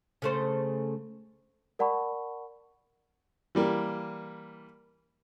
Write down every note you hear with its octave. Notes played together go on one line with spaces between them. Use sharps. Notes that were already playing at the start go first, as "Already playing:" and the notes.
C#3 A3 C5
A#4 D5 F#5 A5 B5 C#6
E3 G3 A#3